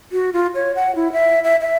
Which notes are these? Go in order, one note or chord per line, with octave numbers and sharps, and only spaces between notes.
F#4
F4
C#5
F#5
E4
E5
E5
E5